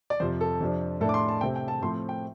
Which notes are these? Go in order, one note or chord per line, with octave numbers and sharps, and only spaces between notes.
D5
F2 C3 F3 C5
A4
F2 C3 F3 D4
A2 A3 D4 A4
D6
C6
A5
C3 A3 C4 G5
G5
A5
A2 F3 A3 C4 C6
G5